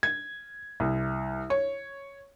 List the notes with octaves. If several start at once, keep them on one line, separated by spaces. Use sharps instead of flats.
G#6
C2
C#5